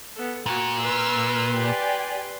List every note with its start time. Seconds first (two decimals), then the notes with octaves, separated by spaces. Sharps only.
0.15 B3 A4
0.46 A#2 F#4 C#6
0.79 B4 C6 E6 F6
1.54 G4 D5 G#5